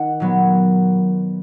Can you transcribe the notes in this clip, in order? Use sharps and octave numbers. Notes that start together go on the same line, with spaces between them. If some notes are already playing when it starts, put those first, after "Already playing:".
Already playing: D#3 F#5
A#2 F#3 B3